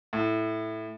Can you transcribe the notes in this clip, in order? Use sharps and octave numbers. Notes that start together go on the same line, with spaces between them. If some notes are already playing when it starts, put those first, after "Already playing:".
A2